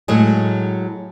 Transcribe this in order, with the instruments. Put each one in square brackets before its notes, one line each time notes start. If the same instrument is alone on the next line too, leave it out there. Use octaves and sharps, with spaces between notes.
[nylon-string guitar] A2 F#3 G#3 G#4